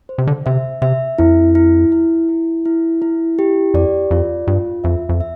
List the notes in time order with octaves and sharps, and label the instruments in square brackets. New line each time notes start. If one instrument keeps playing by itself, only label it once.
[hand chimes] C5
[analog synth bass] C3
D3
[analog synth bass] C3 [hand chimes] E5
[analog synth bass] C3 [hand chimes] E5
[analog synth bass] F2 [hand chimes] E4
[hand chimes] E4
E4
E4
E4
E4
G4
[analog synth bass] F2 [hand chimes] D5
[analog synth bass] F2 [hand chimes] F4
[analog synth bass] G2 [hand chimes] F4
[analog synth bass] F2 [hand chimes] E5
[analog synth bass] F2
[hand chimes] E5